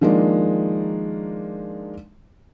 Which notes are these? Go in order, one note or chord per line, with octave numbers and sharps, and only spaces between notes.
D#3 F3 G#3 A#3 D4